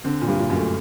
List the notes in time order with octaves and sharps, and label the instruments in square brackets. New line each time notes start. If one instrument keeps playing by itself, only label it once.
[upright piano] D3 [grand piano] C4
[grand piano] A#2
[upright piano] G2
[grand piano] A#2
[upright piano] F#2
[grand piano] A3